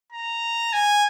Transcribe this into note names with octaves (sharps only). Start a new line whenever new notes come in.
A#5
G#5